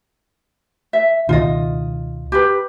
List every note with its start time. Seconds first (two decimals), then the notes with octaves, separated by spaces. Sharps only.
0.93 E5
1.29 C#2 B2 D#3 F4 D#5
2.32 G4 B4